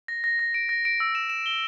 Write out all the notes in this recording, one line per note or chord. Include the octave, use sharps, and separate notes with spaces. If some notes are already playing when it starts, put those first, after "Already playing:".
A#6
A#6
A#6
D7
A#6
D7
E6
E7
E7
G7